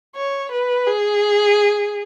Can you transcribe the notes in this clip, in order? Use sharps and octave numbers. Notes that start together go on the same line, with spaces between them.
C#5
B4
G#4